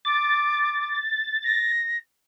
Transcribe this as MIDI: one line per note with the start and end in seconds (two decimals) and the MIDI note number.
0.05 0.97 86
0.05 1.72 93
1.44 1.97 94